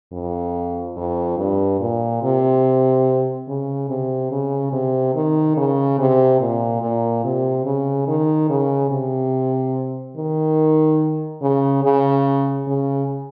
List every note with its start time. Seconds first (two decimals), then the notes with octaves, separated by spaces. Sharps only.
0.12 F2
0.97 F2
1.38 G2
1.80 A#2
2.22 C3
3.48 C#3
3.89 C3
4.31 C#3
4.72 C3
5.15 D#3
5.57 C#3
5.99 C3
6.41 A#2
6.81 A#2
7.24 C3
7.65 C#3
8.07 D#3
8.49 C#3
8.90 C3
10.16 D#3
11.42 C#3
11.83 C#3
12.67 C#3